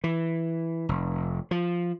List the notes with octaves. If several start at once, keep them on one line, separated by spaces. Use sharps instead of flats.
E3
F1
F3